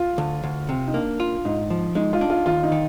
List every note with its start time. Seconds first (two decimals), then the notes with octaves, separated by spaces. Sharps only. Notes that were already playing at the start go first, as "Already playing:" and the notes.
Already playing: F4
0.18 D2
0.44 D2
0.69 C3
0.88 D#4
0.94 A#3 D4
1.20 F4
1.45 G#2 D#4
1.70 F3
1.95 G#3 D#4
2.13 F4
2.21 D4
2.30 F4
2.46 D#2 F4
2.63 D#4
2.72 D#3